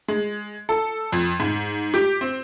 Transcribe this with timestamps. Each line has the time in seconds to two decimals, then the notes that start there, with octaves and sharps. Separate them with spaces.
0.08 G#3
0.69 A4
1.12 F2
1.40 G#2
1.94 G4
2.21 C4